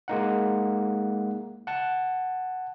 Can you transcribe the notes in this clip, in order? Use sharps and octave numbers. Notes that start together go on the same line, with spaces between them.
G#3 A#3 D#4 F#5
F#5 A5